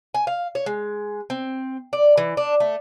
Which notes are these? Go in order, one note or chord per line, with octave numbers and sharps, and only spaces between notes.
G#5
F5
C#5
G#3
C4
D5
E3
D4
A3